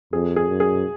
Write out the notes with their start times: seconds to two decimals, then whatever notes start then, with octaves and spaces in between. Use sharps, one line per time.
0.13 F2 G#4
0.36 G#4
0.48 F#2
0.60 G#4